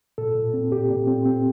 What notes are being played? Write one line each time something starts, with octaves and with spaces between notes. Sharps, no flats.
A#2 A4
A#2
C4
A#2 G4
A#2
C4
C4